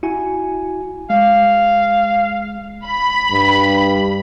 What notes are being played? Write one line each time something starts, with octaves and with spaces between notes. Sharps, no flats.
E4 F#4 G#5
G#3 F5
B5
G2